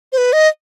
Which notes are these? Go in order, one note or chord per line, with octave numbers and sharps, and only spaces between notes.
C5
B4
D#5